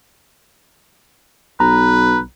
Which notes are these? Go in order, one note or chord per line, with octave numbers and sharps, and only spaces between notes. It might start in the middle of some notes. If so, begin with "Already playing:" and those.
B1 B4 A#5